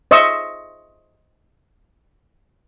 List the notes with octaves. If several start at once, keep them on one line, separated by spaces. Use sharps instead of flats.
C5 D#5 E5 C#6 E6